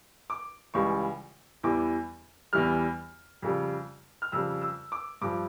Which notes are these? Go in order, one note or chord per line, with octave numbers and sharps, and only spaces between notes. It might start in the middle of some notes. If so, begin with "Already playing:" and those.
D6
C#2 C#3 E3 G3 C#6
E2 E3 G3 D6
E2 E3 G3 F6
F2 C#3 G3
F6
F2 C#3 G3 E6
E6
D6
G2 F3 D6